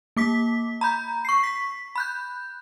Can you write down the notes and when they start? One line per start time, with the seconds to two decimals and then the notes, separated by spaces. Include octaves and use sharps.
0.17 A#3 D6 B6
0.81 A#5 B5 G6
1.25 C#6 C7
1.43 B6
1.95 B5 F#6 G6